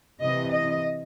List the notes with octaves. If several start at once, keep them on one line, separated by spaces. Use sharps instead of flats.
C3 E3 D#5
D#5